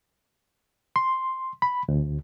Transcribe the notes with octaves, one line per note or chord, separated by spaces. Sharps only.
C6
B5
D2